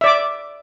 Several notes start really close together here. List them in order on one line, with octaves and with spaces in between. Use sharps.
E5 D5 D6